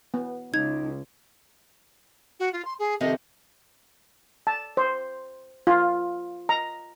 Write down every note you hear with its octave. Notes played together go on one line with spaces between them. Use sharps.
B3
C#2 D#4 G#6
F#4
F4
C6
G#4
F2 C3 D#3 D#5
A5
C5
F4
A#5